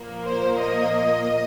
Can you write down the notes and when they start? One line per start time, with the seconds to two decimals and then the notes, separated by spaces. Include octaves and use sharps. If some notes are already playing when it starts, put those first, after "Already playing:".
Already playing: A#2 F3 A#3
0.24 C5
0.61 D#5